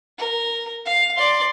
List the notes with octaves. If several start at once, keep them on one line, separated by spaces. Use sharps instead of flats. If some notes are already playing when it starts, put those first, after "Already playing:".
A#4
F5
D5 C6